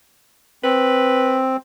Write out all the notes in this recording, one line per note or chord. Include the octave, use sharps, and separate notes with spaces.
C4 B4